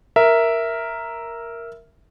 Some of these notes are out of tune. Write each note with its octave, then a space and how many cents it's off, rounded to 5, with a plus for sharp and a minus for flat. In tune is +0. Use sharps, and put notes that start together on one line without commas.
A#4 +0 E5 +0